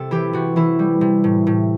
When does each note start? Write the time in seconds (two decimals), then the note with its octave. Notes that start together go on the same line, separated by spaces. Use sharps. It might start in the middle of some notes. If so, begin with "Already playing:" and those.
Already playing: C3 A4
0.11 E3 E4 G4
0.33 C3 F#4
0.56 E3 E4
0.79 G3
1.01 C3
1.24 A2
1.47 A2